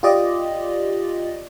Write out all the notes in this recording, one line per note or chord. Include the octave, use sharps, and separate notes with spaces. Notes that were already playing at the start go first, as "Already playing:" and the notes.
F4 G4 D5 D#5